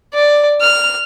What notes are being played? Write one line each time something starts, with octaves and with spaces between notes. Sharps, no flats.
D5
F6